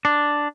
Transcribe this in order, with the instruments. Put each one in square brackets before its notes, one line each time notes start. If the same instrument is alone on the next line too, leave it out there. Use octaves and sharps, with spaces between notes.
[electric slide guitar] D4